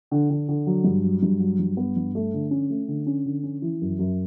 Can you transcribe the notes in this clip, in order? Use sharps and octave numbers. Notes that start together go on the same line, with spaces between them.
D3
D3
D3
F#3
G2
F#3
G2
F#3
G2
B3
G2
A3
D3
C#4
A3
D3
C#4
D3
C#4
E3
F#2
F#2